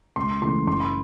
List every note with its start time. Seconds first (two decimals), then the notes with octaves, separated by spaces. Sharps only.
0.16 C#2 C6
0.42 C#3 E3 A3 C6
0.67 F#1 C6
0.80 B5